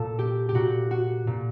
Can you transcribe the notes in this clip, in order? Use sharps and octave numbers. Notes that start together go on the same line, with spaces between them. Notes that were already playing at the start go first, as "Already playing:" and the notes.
Already playing: A#2 A4
G4
G4
A#2 F#4
F#4
A#2